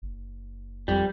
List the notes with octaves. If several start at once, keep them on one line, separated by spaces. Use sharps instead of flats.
F#1
F2 G3